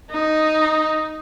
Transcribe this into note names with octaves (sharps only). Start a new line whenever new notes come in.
D#4